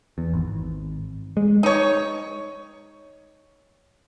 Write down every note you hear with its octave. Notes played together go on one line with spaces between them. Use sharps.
E2
G#1
G#3
D#4 C#5